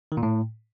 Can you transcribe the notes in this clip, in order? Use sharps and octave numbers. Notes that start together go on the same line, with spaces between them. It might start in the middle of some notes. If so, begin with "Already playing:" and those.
D#3
A#2
A2